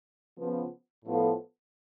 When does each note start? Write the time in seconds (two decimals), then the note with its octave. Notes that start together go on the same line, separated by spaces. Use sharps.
0.37 C#3 F3 B3
1.05 A2 F3 B3 F4 A4